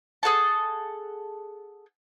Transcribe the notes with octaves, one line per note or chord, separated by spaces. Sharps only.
G#4 A4 F#5 A5